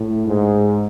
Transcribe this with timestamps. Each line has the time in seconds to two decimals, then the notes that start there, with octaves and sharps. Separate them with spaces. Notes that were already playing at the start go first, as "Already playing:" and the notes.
Already playing: A2
0.26 G#2